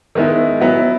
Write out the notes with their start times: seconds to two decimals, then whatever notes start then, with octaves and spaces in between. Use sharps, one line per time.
0.15 D#3 G#3 B3 E4
0.61 F#3 B3 E4